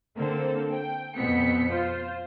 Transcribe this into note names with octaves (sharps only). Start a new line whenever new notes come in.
D3 A#3 C4 A4 C5
G5
F2 B2 B3 C4 B6 C#7
F4 C5